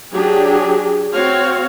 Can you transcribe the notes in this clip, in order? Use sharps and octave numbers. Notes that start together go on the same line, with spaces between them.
F#3 D4 G4 G#4
C4 F#4 C#5 F5